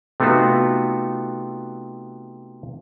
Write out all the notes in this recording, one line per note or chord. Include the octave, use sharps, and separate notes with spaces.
C3 A3 B3 D#4 F4 F#4